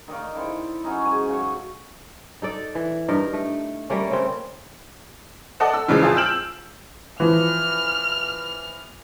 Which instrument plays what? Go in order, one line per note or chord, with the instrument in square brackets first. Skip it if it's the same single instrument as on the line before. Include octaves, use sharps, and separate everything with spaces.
[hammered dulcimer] D#3 D#4 D5 F5
E4 A4 C5 G5
F#3 C#4 D#4
G#2 G#5
C#3 F#3 C#6
[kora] D#4 A4 D5
E3
G2 D#4 A#4
A3
G3 A3 A#3 C#4
C#3 C4
[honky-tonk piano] A4 D5 D#5 F#5 A5
E6
A#2 C#3 E3 F3 G#3
F2 F4 G#4 A5
E6 F6 G6 D7 E7 F#7
[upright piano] E3 F3 [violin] F6